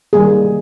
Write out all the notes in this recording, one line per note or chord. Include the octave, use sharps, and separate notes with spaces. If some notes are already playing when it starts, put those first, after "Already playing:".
D#3 G3 A#3 G#4